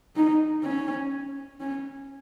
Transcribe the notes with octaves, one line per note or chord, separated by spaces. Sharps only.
D#4
C#4
C#4